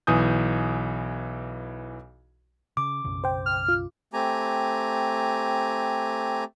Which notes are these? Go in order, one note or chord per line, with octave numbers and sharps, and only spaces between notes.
B1 E3 G#5 D#6 G6
C#3 D6
B1 F#2 C#3
C5 G5
F6
F4
A3 C4 G4 G#5 A#5